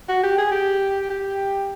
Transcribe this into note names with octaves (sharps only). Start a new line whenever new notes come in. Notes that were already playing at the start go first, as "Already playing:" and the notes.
F#4
G4
G#4
G4
G4